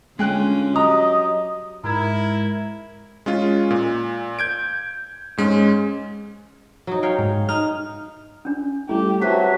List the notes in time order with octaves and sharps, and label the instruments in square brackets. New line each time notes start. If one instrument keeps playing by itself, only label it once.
[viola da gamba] D3 C#4 F4 [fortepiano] G#3 G5 F#6
[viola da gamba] F#3 G4 [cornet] D#5 [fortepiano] A#5 [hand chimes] D#6
[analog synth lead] G#2 [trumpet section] E4 A#4 [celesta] A#5 G#6
[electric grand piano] G#3 C#4 F4
A#2
G6 G#6 D7
G#2 G#3 C#4
[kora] F#3 D#4
C#5 F5 G5
[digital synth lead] G#2
[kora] D#4 [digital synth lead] F6
[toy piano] C#4 D4
[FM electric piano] G3 A3 [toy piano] E4 [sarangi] G4
[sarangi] F#3 [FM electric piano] C4 F#4 [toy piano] G4 A5 [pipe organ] B4 E5